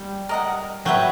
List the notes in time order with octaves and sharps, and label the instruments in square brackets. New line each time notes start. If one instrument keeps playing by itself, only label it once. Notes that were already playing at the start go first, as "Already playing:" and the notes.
Already playing: [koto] G3
[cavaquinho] A#4 D#5 F#5
[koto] F#3 [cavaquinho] B4 E5 G5